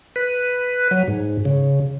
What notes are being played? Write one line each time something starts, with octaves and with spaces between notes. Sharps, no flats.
B4
F#3
G#2
C#3